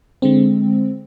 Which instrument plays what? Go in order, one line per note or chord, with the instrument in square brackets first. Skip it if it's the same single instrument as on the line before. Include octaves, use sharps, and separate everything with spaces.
[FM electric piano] D3 G#3 C4